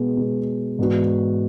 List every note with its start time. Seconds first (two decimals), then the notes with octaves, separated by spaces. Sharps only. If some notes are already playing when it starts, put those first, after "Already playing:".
Already playing: B2 G#3 B3
0.17 B2 G#3 B3
0.79 G#2 E3 B3 D4 F#4